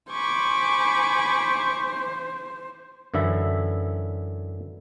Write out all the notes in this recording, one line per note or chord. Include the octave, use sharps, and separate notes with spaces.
C5 G#5 B5 C#6 D6
F#2 D3 E3 E4 E5